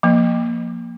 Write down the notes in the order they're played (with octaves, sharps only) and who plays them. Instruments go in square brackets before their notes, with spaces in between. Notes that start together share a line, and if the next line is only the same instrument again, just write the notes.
[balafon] F3 A#3